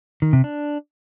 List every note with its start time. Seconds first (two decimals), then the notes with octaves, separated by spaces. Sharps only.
0.22 D#3
0.33 C3
0.44 D4